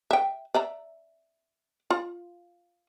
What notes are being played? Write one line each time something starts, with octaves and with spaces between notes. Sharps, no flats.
E5 G5
D5 E5 A#5
F4